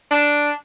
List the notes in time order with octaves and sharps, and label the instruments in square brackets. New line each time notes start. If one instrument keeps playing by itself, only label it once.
[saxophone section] D4